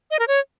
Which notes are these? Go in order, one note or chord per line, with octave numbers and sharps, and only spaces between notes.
D#5
A#4
C#5